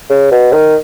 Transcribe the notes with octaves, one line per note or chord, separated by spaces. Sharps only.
C#3
B2
D#3